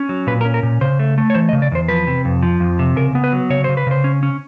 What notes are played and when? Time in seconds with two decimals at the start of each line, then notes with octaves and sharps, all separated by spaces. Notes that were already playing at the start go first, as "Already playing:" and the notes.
Already playing: C#4
0.09 F#3
0.27 A#2 B4
0.41 A#4
0.45 C#4
0.54 A#4
0.63 A#2
0.81 C#3 C5
0.99 A3
1.18 A3
1.30 C#5
1.34 E3 C5
1.49 D#5
1.53 C#3
1.62 D5
1.71 E2 C5
1.88 F3 B4
2.07 C3
2.25 F2
2.42 F3
2.60 F2
2.79 C3
2.96 C#3 A#4
3.15 B3
3.24 B4
3.32 F#3
3.50 C#3 C#5
3.64 C#3 C5
3.77 B4
3.87 C#3 C5
4.04 C#4
4.23 C#4